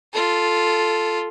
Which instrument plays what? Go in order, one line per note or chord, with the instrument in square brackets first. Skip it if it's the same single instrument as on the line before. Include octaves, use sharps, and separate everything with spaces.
[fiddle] F4 A4